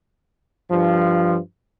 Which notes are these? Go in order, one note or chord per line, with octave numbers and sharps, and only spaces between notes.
G2 F3